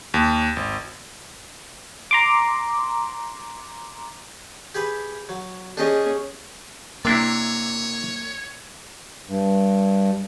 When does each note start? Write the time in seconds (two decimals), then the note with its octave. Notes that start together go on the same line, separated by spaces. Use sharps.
0.14 D#2
0.56 G#1
2.11 A#5 C6 D6
4.75 G4 G#4 B4
5.29 F#3
5.77 C#4 D4 G4 G#4 D#5
7.05 C3 A#3 D4 E4 C#5
9.27 G2